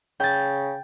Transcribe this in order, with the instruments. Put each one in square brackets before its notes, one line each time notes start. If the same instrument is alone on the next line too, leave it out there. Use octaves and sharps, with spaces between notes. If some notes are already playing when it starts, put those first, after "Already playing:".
[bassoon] C#3 [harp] G5 A6